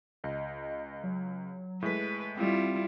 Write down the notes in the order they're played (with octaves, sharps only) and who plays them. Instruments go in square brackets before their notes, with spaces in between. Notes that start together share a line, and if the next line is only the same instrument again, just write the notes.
[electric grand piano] C#2 [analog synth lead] D#5
[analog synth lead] F#3
[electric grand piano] A2 G#3 B6 [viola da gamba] B4
[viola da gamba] G3 E4 F4 [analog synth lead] C4